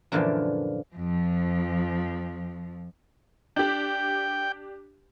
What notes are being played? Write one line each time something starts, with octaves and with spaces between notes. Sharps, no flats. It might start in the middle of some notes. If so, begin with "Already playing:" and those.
F#2 A#2 D3 E3 F3
F2 F3
D4 G4 G5